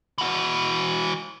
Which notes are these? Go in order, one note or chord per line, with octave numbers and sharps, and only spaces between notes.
E3 F#4